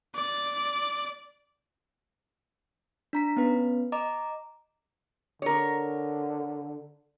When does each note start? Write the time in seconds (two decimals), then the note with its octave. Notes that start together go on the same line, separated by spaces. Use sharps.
0.16 D5
3.13 D4 A#5 B6
3.37 B3 C#4 B4
3.92 D#5 A#5 D6
5.42 D3 A#4 C#5